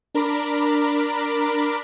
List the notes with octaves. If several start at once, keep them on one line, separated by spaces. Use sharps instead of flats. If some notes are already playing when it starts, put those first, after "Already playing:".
D4 A#4 A#5 B5 D6